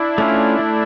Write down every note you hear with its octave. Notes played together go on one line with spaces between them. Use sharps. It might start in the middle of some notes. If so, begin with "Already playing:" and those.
Already playing: D4 E4
A3 C#4 F4
A3